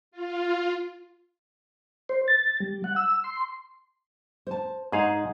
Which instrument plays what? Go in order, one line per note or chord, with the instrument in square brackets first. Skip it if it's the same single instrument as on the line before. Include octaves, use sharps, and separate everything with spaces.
[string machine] F4
[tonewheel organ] C5
A6
G3
F#5
E6
C6
[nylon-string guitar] C5 A5
[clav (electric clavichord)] G#2 G#4 F5 [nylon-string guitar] D#4 C#5 D#5